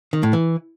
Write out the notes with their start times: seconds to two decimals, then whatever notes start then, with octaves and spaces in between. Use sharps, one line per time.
0.13 D#3
0.23 A2
0.33 E3